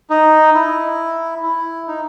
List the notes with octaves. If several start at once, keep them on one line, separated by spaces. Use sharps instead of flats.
D#4
E4
E4
D#4